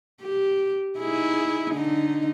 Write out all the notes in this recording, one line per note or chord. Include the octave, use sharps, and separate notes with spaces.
G4
D#4 E4 G#4
D3 D#4